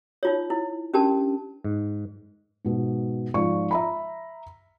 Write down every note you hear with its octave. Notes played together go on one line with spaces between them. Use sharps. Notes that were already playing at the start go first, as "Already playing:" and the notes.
D#4 F4 C#5
E4
C#4 D4 G4 A#4 A5
G#2
G#2 B2
G#2 F3 D5 C#6
E5 A#5 B5